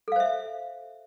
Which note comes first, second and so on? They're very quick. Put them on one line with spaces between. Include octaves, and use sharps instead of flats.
A4 F5 C5 E5